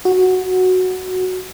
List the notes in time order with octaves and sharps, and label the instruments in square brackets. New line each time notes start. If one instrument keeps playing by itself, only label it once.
[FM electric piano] F#4